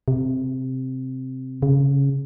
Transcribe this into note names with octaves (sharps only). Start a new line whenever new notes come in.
C3
C#3